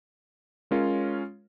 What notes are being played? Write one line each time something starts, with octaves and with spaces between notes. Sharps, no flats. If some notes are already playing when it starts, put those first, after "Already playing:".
G#3 C#4 F4 A#4 C#5